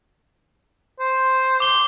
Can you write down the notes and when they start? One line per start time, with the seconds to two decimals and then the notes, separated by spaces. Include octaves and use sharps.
1.00 C5
1.60 D6 G7